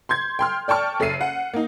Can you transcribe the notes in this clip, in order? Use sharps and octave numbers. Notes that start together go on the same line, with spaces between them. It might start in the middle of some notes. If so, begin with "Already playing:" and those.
C6 G6 G#6
G5 C6 F6
D5 G5 A5 C#6 F6
F#1 A4 E5 C7 D#7
F#5
A#3 D#4